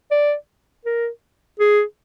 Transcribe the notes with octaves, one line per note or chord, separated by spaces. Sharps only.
D5
A#4
G#4